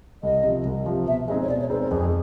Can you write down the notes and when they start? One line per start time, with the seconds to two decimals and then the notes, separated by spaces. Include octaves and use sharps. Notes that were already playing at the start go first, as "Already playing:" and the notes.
0.23 C2 D#5
0.43 C3 F3
0.65 C2
0.86 C3 F3
1.07 B2 E5
1.27 G#3 C4 D#4 G#4 D#5
1.41 C#5
1.49 B2 D5
1.59 C#5
1.70 G#3 C4 D#4 G#4 B4
1.81 A#4
1.91 F2 G#4